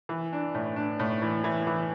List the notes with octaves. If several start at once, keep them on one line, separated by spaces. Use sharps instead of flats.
E3
D4
A2
D4
A2
E3
E3
E3